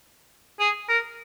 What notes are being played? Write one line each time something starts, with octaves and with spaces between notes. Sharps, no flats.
G#4
A#4